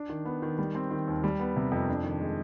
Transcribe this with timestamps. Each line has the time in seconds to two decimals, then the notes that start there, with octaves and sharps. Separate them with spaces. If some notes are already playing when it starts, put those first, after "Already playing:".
Already playing: D4
0.09 D#3
0.25 B3
0.42 D#3
0.59 G3
0.75 C4
0.91 D#3
1.08 D#2
1.24 G3
1.40 B3
1.56 C3
1.72 F2
1.88 D4
2.04 D#3
2.21 G#3